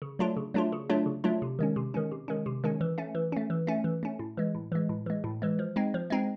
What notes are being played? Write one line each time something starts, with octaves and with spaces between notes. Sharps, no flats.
C#3
F#3 A3 D4 F4
C#3
F#3 A3 D4 F4
C#3
F#3 A3 D4 F4
C#3
F#3 A3 D4 F4
C3
D#3 G#3 C#4
C3
D#3 G#3 C#4
C3
D#3 G#3 C#4
C3
D#3 G#3 C#4
E3
A3 C#4
E3
A3 C#4
E3
A3 C#4
E3
A3 C#4
A2
E3 G#3
A2
E3 G#3
A2
E3 G#3
A2
E3 G#3
F3
G#3 C4 D#4
F3
G#3 C4 D#4